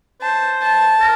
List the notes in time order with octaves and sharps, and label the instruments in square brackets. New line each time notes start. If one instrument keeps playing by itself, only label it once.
[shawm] C5 [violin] A5
[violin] A5
[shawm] A#4